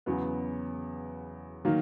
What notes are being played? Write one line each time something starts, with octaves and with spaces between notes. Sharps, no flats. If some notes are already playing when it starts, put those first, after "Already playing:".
E2 C#3 F#3 B3
D#3 F#3 A#3